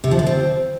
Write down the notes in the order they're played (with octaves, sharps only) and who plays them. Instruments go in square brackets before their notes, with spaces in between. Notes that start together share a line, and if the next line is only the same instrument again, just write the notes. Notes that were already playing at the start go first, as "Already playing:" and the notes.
[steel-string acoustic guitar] C3
F3
D3
C4